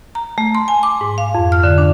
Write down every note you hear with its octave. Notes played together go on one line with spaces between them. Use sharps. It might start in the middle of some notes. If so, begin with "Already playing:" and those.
A#5
A3
C6
G#5
D6
G#2
F5
F2
F6
D3
D4